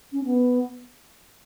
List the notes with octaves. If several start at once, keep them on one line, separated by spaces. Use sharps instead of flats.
C#4
B3